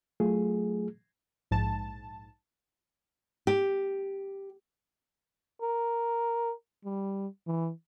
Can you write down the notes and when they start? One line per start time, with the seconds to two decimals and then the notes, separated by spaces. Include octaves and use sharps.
0.20 F#3 A3 F4 G#4
1.51 A#1 G#2 A5
3.47 G4
5.62 A#4
6.85 G3
7.47 E3